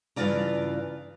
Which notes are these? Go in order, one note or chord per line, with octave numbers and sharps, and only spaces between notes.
G2 C#3 E3 F4 D5 A#5